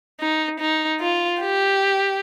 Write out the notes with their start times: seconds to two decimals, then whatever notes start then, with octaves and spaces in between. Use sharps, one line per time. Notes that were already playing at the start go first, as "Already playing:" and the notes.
0.20 D#4
0.60 D#4
1.01 F4
1.41 G4